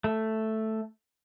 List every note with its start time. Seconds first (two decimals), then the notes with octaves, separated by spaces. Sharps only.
0.04 A3